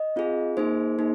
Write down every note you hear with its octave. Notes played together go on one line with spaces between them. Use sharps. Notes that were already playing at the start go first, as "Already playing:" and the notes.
Already playing: D#5
C4 F4 G#4
A#3 D#4 G#4 C5
A#3 D#4 G#4